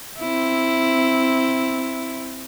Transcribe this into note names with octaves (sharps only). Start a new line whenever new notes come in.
C4 E4